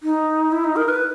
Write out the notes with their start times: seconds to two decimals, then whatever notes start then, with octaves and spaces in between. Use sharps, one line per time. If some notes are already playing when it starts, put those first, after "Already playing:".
0.03 D#4
0.52 E4
0.64 D#4
0.76 A#4
0.88 B4